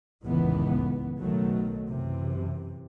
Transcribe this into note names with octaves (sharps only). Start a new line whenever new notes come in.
F1 C#2 A2 D#3 E3 B3
B1 B2 D#3 F#3 A3
F#2 C3 E3